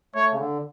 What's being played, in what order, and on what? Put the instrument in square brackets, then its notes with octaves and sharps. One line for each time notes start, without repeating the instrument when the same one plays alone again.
[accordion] A3 [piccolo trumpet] C#5
[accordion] C#3
D3